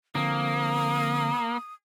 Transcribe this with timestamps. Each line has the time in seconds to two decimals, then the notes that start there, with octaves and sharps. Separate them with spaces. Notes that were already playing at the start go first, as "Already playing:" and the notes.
0.15 D3 F3 A#3 C4 D#6